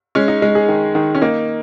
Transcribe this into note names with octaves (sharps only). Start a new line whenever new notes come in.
G#3 C#4
D#4
G#3
G#4
D#3
D#3
C#4
A#3 D#4